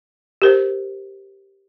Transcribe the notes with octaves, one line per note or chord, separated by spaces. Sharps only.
G4 A#4 C5